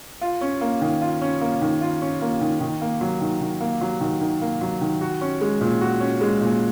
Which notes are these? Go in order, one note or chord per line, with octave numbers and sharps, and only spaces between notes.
F4
C#4
A#3
D#3
F4
C#4
A#3
D#3
F4
C#4
A#3
D#3
D#3
A#3
F#3
D#3
D#3
A#3
F#3
D#3
D#3
A#3
F#3
D#3
F#4
C#4
G#3
A#2
F#4
C#4
G#3
A#2